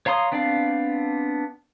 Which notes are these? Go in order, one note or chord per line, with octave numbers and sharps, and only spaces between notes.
C#5 F5 A#5 C6 D#6
B3 C4 D4 D5 F5